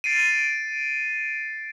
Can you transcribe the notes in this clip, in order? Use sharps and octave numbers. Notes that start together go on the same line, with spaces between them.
A6 C7 D7 D#7